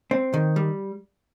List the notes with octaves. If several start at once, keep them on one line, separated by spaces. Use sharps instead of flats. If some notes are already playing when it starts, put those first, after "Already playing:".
C4
D#3
G3